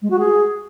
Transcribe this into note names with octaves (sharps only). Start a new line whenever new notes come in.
G#3
F#4
G#4